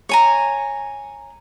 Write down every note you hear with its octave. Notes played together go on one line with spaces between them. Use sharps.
C#5 G#5 A#5